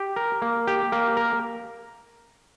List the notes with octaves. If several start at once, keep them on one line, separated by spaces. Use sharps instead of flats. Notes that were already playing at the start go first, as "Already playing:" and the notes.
Already playing: G4
A#4
A#3
G4
A#3
A#4